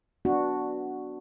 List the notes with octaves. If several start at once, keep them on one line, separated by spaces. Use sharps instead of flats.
B3 D4 F#4